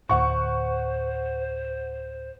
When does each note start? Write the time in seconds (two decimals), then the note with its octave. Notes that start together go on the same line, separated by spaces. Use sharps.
0.09 D2 A2 C5 F#5 C#6